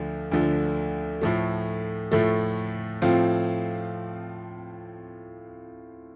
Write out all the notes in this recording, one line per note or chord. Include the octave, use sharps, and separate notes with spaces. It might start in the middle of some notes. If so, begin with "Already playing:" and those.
Already playing: D2 D3 F3
D2 D3 F3
A2 F3 A3
A2 F3 A3
A2 F3 C4 F4